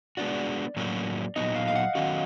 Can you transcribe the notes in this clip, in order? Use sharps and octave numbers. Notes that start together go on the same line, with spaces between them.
G#3 B3 D4 F#4 D5
A2 F#3 A#3 C#4 F#4
A#2 F#3 B3 D#4 D#5
F5
F5
F#5
D#3 F#3 A3 C#4 F#4